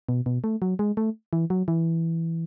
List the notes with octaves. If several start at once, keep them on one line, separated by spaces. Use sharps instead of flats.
B2
B2
A3
F#3
G#3
A3
E3
F#3
E3